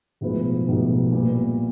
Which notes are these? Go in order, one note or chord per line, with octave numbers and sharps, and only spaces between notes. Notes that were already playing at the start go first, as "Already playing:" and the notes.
B1 A2 F3 G#3 B3
B1 A2 F3 G#3 B3
A#2 G3 B3